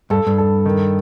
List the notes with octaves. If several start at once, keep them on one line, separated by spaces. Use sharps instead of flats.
G2 A4
G2
A4
D#3